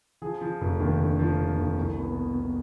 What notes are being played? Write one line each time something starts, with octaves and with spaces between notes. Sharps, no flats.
F3 G#4
F3
F1
D#2
D3
F3
D3
D#2
C2
B3
B2
B2